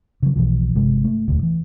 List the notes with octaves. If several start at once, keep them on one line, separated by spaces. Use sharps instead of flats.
C#3 F#3
B1 B2 E3 F3
G1 C3 G#3
A3
E1 D2
E3